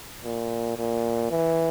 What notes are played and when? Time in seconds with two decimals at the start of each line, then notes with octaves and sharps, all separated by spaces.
0.25 A#2
0.77 A#2
1.31 E3